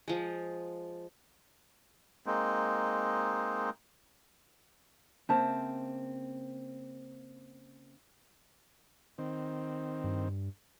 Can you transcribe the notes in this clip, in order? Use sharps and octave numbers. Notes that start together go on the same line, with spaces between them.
F3 G#3
G#3 A#3 C4 D#4
C#3 A#3 C4 C5 E5 A5
D#3 C4
G2